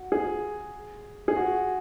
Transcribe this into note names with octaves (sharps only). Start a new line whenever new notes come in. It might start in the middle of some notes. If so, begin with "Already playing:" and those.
Already playing: F#4
G#4
G#4
F#4